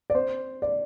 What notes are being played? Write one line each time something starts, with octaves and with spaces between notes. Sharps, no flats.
D5
C4 C5
D5